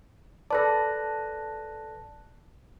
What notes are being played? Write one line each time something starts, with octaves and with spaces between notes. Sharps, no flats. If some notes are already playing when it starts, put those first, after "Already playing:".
A4 B4 D5 A5 F#6 A#6